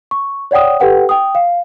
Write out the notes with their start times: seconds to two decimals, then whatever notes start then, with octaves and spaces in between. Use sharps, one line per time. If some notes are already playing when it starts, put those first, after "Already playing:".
0.11 C#6
0.51 C#5 D5 F#5 G5 D#6
0.80 G4 A4 B4 F#5 G5
1.09 G5 D#6
1.35 F5